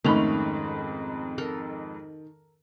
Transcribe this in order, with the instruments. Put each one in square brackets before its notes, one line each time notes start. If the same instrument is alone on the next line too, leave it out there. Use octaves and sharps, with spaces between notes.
[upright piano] F2 G#2 B5 [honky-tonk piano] D#3 F7 [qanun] A3 C#4
[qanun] A4 A#4